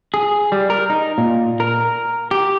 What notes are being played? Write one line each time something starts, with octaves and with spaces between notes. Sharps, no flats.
G#4
G3
A#4
D#4
A#2
A#4
G4